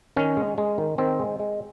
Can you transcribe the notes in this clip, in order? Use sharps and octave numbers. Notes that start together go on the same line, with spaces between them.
D#3 C#4
G#3
G#3
D#3
D#3 C4
G#3
G#3